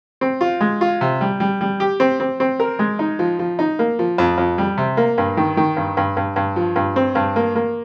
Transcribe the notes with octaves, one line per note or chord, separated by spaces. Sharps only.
C4
F4
G#3
F4
C3
G3
G3
G3
G4
C4
C4
C4
A#4
G#3
D#4
F3
F3
D#4
A#3
F3
F2
F2
G3
C3
A#3
G2
D#3
D#3
G2
G2
G2
G2
F3
G2
C4
G2
A#3
A#3